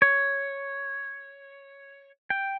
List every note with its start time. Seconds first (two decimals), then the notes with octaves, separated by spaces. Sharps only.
0.02 C#5
2.30 G5